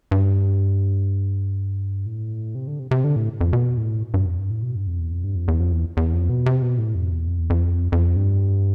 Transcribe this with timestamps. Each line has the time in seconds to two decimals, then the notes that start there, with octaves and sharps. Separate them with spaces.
0.11 G2
2.06 A2
2.55 C3
2.67 D3
2.79 C3
2.91 C3
3.04 D3
3.16 A2
3.41 F2
3.53 B2
3.77 A2
4.14 G2
4.26 F2
4.39 G2
4.50 A2
4.63 B2
4.75 G2
4.87 F2
4.99 E2
5.12 F2
5.24 G2
5.36 F2
5.48 E2
5.60 F2
5.73 E2
5.97 E2
6.13 F2
6.30 B2
6.46 C3
6.62 B2
6.78 A2
6.95 F2
7.11 E2
7.27 F2
7.39 E2
7.50 F2
7.92 F2
8.16 G2